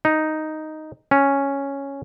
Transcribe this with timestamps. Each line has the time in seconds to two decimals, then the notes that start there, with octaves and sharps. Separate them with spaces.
0.05 D#4
1.11 C#4